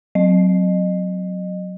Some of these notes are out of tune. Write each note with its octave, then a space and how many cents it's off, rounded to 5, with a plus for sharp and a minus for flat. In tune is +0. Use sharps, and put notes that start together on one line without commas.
F#3 +0 D#5 -25